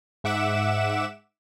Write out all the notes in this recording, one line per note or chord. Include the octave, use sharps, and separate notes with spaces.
G#2 E5 F#5 D6 E7